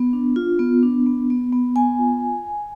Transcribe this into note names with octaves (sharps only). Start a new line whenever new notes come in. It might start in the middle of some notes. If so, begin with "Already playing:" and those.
Already playing: B3
D4
F4
B3
D4
B3
B3
B3
B3 G#5
F4